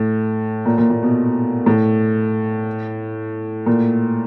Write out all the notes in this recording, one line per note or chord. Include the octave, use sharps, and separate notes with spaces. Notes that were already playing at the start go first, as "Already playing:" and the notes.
Already playing: A2
A#2
A#2
A#2
B2
A2
A#2